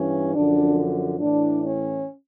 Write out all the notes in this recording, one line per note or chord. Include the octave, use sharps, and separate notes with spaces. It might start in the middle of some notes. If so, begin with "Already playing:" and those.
Already playing: G2 E3 C#4
F#2 D3 F3 D4
A2 E3 D4
C#4